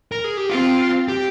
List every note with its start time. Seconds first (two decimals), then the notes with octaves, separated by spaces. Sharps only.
0.12 A#4
0.24 G#4
0.37 G4
0.50 C4 F4
1.08 G4